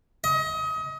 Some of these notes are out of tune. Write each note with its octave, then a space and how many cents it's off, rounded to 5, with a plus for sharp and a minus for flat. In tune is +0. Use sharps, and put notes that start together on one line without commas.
D#5 +30